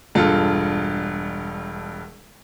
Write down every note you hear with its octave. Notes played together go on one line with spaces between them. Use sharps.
E1 G2 F4 A4